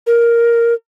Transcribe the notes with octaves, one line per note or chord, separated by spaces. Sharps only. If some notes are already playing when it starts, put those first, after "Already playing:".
A#4